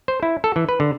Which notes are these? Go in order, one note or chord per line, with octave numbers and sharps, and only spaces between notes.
C5
E4
A4
E3
B4
D3